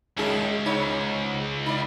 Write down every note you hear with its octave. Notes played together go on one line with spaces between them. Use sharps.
C#2 F#2 D#3 G#4
G#2 D#4 C#5
D#4 D5